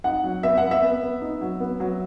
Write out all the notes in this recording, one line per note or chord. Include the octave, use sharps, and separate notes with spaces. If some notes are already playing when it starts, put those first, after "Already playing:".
D#4 F#5
F#3
B3 E5
F#5
B3
E5
B3
B3
D#4
F#3
B3
F#3